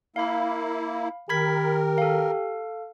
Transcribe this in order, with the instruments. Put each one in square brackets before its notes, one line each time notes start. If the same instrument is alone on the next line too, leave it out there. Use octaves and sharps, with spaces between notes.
[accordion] A#3 E4 [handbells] F5 B5
[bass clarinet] D#3 [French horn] G4 [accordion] A#4 [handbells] B5 G#6 B6
[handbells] A4 F5